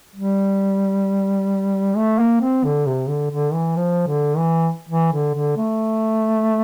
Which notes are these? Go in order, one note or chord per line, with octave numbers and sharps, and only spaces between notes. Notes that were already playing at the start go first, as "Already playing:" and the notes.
G3
A3
A#3
C4
D3
C3
D3
D3
E3
F3
D3
E3
E3
D3
D3
A3